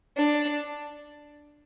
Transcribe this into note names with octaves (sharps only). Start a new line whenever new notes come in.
D4